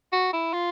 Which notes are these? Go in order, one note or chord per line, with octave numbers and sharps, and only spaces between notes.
F#4
E4
F4